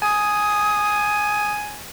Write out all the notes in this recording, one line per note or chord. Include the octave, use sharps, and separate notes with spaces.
G#5 D#6